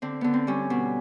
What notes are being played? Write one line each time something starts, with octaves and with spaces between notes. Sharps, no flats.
D3 C4
D3 B3
C4
G3 C#4
B2